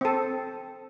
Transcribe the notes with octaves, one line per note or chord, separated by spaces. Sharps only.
C4 A4